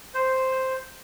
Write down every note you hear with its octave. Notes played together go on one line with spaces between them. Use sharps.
C5